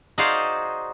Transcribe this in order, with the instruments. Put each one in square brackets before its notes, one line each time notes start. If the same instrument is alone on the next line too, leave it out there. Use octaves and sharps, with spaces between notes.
[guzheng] D#4 F#4 G#4 C5 D5 F5